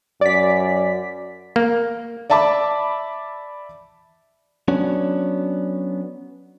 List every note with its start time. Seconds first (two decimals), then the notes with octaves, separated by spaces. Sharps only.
0.21 F#2 D5 B6
1.56 A#3
2.30 D5 E5 A5 B5 D6
4.68 F#3 B3 C#4 D4